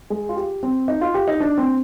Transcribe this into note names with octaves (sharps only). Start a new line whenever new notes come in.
G#3
F4
G4
C4
D#4
F4
G4
D#4
D4
C4